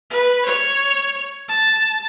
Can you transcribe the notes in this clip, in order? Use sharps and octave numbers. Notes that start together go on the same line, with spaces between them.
B4
C#5
A5